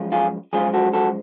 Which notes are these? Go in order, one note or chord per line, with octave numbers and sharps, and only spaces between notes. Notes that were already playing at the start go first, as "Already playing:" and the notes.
Already playing: F#2 F3 G#3
F4 G#4
F#2 F3 G#3 F4 G#4
F#4 A4
F#4 A4